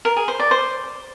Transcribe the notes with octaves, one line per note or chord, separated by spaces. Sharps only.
A#4
G#4
C5
D5
C5